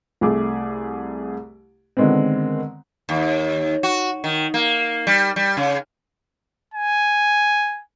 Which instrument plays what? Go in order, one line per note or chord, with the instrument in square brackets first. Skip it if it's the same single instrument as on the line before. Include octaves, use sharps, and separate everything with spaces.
[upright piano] C2 A3 G#4 D6
D3 D#3 G#3 B3 C4
[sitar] D#2
F#4
D#3
A#3
G3
G3
C#3
[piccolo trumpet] G#5